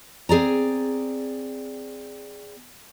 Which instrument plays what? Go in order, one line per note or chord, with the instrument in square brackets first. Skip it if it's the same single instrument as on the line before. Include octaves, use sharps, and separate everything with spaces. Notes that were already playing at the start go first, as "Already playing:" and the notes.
[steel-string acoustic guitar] C4 G#4 D5 A#5